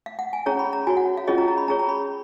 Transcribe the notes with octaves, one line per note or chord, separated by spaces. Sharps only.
F5
F#5
G#5
C#4 G#4 C#5 A#5
B5
A#5
F#4 C#5 G#5
F#5
F5
C#4 F4 G#4 C#5 D#5
A#5
A#5
B5
C#4 G#4 C#5 A#5
A#5
B5